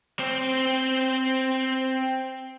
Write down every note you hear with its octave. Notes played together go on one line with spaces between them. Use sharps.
C4 C5